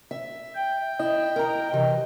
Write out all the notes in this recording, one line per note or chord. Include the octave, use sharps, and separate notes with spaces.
E5
G5
E4 D#5
A#4 A#5
C3 E3